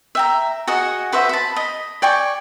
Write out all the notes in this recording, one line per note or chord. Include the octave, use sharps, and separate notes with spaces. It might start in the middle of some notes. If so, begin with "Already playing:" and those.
E5 G5 A#5
F#4 G#4 D#5 F#5
F#4 B4 C5 E5
A5 B5
D#5 B5
D5 G5 G#5 C#6